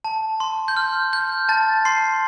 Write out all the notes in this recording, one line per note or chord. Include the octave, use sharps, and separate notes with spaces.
A5
C6
G6
F6
G6
A5 A6
C6 C7